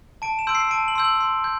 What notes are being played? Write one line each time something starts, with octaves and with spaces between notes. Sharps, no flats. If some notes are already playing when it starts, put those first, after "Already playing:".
A5 D7
E7
C6 E6 G6 D7
C7
A5 D7
F#7
C6 E6 G6
F#7
C6
G6